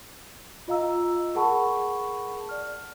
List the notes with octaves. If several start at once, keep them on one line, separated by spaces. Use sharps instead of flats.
F4 D#5 F5 A#5 E6
G#4 A#4 F#5 A5 B5 C#6
D5 F6